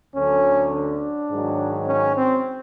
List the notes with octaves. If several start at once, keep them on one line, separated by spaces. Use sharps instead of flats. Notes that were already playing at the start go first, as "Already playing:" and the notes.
D2 D3 F#3 C#4
D4
G#2 D#3 F#3
C#4
C4